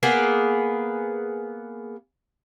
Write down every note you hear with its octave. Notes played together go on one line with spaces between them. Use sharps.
A#3 B3 G#4